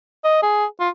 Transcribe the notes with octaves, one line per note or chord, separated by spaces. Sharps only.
D#5
G#4
F4